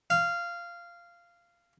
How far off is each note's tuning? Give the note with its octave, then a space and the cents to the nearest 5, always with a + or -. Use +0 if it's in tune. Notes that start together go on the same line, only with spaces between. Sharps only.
F5 -15